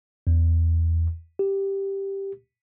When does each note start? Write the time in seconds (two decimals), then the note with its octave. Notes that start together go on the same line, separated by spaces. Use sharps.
0.27 E2
1.39 G4